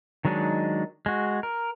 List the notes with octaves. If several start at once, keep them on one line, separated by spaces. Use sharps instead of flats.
D#3 F#3 G#3 D4 D#4
G#3 F#4
A#4